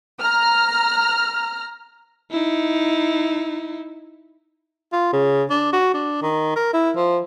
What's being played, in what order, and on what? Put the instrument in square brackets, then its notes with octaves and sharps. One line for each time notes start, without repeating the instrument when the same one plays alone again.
[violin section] A#5 F6
[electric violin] D#4 E4
[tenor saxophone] F4
C#3
D4
F#4
D4
D#3
A#4
E4
F3